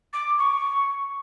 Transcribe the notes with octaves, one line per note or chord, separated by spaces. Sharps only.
D6
C#6